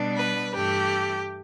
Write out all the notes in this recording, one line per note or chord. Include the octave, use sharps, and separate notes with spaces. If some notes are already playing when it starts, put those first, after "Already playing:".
Already playing: B2 G3 B3 D4
B4
G2 E3 A3 G4